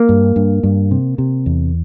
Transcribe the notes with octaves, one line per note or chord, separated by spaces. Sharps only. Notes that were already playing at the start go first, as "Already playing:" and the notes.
Already playing: A#3
G2
G2
G2
C3
C3
E2